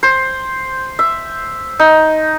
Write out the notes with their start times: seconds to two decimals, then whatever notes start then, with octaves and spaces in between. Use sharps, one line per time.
0.03 C5
0.99 E5
1.79 D#4